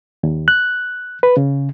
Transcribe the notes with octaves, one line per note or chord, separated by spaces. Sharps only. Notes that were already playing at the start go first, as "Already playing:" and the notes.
D#2
F#6
B4
C#3